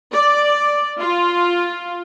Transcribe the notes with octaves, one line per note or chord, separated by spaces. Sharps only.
D5
F4